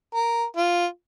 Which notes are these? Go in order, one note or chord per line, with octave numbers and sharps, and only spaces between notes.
A#4
F4